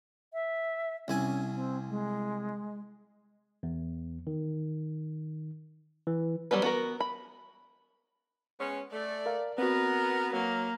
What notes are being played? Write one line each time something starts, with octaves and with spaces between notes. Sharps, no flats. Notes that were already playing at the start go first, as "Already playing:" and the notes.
E5
C2 C#4 E4 G#5
C4
G#3
E2
D#3
E3
F#3 G3 A#3 B3 B4
B3 F#4 A#4
B5
G#3 B3 C#4
A3 D5
A#4 F5
B3 C4 F#4 A#4
F#3 A#3